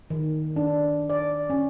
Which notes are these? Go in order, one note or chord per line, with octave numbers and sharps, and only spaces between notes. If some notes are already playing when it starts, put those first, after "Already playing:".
D#3
D4
D5
C#4